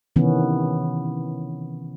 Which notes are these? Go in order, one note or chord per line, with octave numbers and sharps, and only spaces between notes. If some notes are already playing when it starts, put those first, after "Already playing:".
C3 D#3 E3 B3 C#4